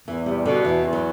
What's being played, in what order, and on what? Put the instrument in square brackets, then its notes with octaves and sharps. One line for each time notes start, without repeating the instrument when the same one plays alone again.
[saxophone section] E2 [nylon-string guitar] E3
[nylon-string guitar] C3 [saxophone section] G3
[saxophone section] B2 [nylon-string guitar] D3
[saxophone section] E2 [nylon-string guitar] E3
[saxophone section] E2
[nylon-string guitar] F#3